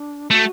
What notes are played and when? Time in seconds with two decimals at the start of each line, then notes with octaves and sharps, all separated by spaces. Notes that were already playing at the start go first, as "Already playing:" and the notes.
Already playing: D4
0.31 A3 F#4